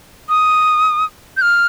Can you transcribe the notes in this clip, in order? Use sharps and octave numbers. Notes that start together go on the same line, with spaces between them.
D#6
G6
F6